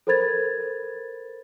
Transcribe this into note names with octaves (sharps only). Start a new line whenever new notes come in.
A4 A#4 C5 B5 G#6 A6